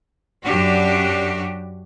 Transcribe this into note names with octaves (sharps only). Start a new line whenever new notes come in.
F#2 D4 F#4 G4